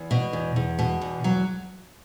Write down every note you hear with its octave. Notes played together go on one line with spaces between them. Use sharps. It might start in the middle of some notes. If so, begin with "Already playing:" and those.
Already playing: E2
B2
E2
E2
B2
E2
F#3